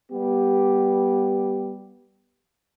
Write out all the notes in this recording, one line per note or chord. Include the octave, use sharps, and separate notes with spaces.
G3 B3 G4